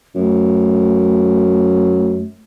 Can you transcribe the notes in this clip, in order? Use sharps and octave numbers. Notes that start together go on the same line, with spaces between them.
F#2 A3